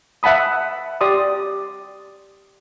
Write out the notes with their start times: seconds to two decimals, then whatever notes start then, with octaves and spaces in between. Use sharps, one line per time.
0.23 E5 F#5 A5 B5 D#6
1.01 G4 D5 C6 D#6